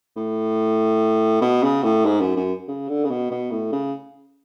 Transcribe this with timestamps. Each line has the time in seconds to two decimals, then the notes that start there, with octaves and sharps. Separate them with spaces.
0.16 A2
1.41 B2
1.63 C#3
1.84 A2
2.05 G#2
2.21 F#2
2.36 F#2
2.68 C#3
2.89 D3
3.04 C#3
3.10 B2
3.31 B2
3.51 A2
3.72 C#3